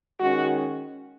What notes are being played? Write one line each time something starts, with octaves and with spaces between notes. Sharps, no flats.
D#3 G#3 C#4 F#4